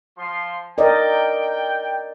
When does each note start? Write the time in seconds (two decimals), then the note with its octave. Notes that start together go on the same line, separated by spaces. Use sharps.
0.18 F3 C6
0.78 A#4 D5 D#5 G5